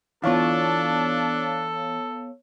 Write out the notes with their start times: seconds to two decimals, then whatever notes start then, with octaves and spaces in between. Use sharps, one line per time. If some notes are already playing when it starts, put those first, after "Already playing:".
0.23 E3 B3 D4 F4 A4 C#5 F5